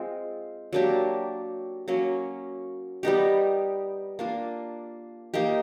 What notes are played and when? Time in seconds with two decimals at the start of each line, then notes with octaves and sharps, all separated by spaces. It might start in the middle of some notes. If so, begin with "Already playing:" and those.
Already playing: G#3 C4 F4
0.73 F#3 A#3 D4 G4
1.88 F#3 A#3 C#4
3.03 G3 B3 D#4 G4
4.19 A#3 D4 F4
5.34 A#3 D#4 G4